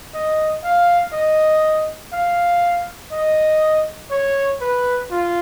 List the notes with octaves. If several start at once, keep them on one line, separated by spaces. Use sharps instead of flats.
D#5
F5
D#5
F5
D#5
C#5
B4
F4